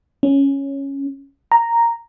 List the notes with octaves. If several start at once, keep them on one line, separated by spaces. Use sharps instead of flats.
C#4
A#5